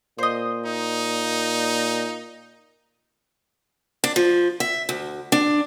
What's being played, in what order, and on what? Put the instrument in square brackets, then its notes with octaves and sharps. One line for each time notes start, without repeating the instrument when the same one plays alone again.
[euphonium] A#2 [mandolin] C5 D#5
[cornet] D#4
[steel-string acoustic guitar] D4
F3
E5
D2
D4